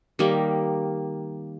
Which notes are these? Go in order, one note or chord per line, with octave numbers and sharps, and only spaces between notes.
D#3 G3 A#3